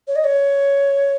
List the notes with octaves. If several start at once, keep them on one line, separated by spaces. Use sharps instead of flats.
C#5
D#5
C#5